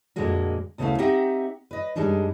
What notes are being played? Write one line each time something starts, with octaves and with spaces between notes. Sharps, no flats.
F2 A#2 D3 G#3 A#3 F#4
D2 C#3 A3 B3 E4 F5
C4 D#4 G4 E5 F#5
B4 D#5
F#2 G3 G#3 D4 D#4